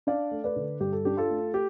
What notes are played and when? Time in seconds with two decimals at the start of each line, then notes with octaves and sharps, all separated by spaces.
0.07 D4 D5 F5
0.31 A3
0.44 B4 D5
0.56 D3
0.80 G2 G4
0.93 A4
1.05 D4 G4
1.17 F4 A4
1.30 A3
1.54 G4